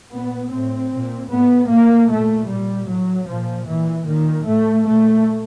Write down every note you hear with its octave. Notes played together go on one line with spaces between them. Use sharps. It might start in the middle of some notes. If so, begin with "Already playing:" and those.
A#2 B3
A2 C4
A#2
A2 B3
A2 A#3
A#2 A3
A#2 G3
A2 F#3
A#2 F3
A#2 E3
A#2 D#3
A2 A3
A#2 A3